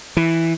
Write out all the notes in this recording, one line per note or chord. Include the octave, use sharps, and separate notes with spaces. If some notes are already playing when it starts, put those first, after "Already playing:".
E3